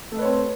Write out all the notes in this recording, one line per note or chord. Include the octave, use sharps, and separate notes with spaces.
A3 C4 B4 C#5 D#5